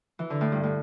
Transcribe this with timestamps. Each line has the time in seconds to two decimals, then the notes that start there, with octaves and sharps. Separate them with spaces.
0.19 E3
0.30 D3
0.41 A2
0.52 G2
0.63 A2